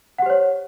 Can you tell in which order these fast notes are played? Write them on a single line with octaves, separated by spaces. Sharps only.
F#5 G4 C5 C#5